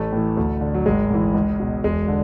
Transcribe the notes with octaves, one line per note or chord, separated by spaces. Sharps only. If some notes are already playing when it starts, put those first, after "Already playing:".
Already playing: A1 A3
A2 E3
D2
D3
F#3
G#1 G#3
G#2 E3
C#2
B2
E1 G#3
D3